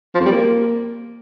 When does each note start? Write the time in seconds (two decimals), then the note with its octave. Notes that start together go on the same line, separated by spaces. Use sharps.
0.15 F3
0.20 F2
0.26 G3
0.31 A#3